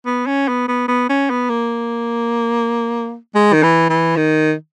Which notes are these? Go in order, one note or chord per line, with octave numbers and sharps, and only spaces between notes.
B3
C#4
B3
B3
B3
C#4
B3
A#3
G#3
D#3
E3
E3
D#3